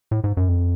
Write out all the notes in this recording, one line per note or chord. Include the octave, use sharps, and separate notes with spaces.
A2
G#2
F#2
F2